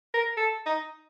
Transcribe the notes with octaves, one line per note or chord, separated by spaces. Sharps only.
A#4
A4
D#4